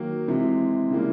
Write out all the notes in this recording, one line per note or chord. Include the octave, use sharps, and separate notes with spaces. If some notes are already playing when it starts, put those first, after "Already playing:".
Already playing: D#3 F#3 A#3
C3 E3 G#3
C#3 E3 G3 A#3